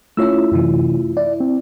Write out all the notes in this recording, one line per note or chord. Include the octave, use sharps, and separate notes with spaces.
A3 C#4 E4 F4 C#5 E6
F#2 C3 E3
E4 D5
C4